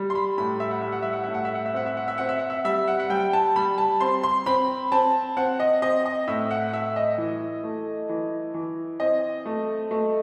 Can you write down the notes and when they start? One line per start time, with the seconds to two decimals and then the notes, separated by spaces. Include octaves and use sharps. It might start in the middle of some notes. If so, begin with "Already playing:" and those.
Already playing: G3
0.10 C6
0.15 B5
0.38 A2 B5
0.60 E5
0.71 F#5
0.82 G3 E5
0.92 F#5
1.02 E5
1.13 F#5
1.24 A2 E5
1.34 F#5
1.45 E5
1.55 F#5
1.66 E5
1.74 C4 F#5
1.86 E5
1.97 F#5
2.08 E5
2.18 C4 F#5
2.29 E5
2.39 F#5
2.50 E5
2.65 G3 E5
2.88 F#5
3.00 F#5
3.10 G3 G5
3.33 A5
3.56 G3 B5
3.78 A5
4.01 C4 C6
4.23 C6
4.46 C4 B5
4.92 C4 A5
5.37 C4 F#5
5.60 D#5
5.82 C4 D#5
6.06 D#5
6.27 A2 E5
6.51 F#5
6.73 A2 E5
6.96 D#5
7.18 E3
7.63 A3
8.09 E3
8.54 E3
9.00 C4 D#5
9.46 A3
9.91 A3